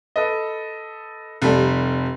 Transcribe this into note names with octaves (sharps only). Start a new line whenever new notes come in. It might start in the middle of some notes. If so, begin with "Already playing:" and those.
A4 B4 D#5
F1 G3 A4